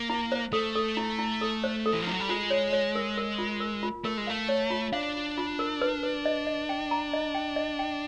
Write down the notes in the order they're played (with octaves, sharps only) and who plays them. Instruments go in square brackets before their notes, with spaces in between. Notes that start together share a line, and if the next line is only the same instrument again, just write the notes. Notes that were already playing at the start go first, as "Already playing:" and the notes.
Already playing: [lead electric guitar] A#3
[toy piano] E4
C5
[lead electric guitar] A3 [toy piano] A4
[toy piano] A4
E4
E4
A4
C5
A4
[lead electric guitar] E3
F3
[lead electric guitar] F#3 [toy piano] E4
[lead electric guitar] G3
[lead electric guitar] G#3 [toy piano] F4
[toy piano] C#5
C#5
A#4
A#4
F4
A#4
F4
[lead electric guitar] A3 [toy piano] A#4
[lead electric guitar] G#3
[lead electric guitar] A3 [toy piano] F5
[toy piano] C#5
F4
[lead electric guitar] D4 [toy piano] F5
[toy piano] F4
F4
A#4
B4
B4
D#5
D#5
G5
A#5
D#5
G5
D#5
G5